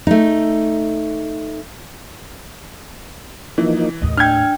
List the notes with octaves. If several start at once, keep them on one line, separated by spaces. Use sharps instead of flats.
A3 D#4
E3 F3 A#3 D#4
D#2 A2 D#5
D4 G5 F6 G6 G#6